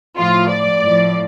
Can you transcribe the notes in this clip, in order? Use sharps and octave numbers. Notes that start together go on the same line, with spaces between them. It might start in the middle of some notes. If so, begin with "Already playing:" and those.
A2 F3 F4
D5
A2 F3